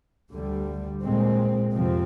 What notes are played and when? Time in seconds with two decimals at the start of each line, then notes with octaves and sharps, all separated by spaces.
0.29 D2 D3 G3
1.01 A#2 G#3 C4
1.72 F2 C3 F3 C4